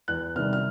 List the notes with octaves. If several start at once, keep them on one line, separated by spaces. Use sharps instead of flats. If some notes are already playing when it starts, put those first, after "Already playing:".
E2 F#6
C3 D#3 G3 F6
F6